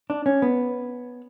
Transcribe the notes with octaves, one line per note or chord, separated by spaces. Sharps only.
D4
C#4
B3